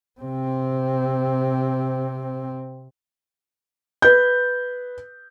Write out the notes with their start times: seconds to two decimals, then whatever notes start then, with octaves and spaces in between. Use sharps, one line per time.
0.20 C3 C4
4.02 B4 G6